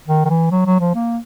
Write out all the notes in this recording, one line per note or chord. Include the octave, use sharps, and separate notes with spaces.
D#3
D#3
E3
F#3
F#3
F3
A#3